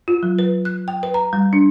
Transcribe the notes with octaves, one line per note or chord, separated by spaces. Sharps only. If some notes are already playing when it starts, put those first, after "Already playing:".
F4
F#3
B4
F#6
G5
B4
A#5
G3
D4